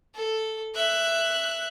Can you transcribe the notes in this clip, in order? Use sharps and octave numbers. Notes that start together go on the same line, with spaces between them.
A4
E5 F#6